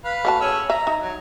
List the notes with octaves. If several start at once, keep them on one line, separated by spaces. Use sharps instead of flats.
B4 F5
A3 F#4 A5
C#4 G#4 E6
E5 A#5
D#4
F#3